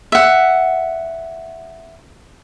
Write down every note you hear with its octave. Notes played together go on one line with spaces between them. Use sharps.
E5 F#5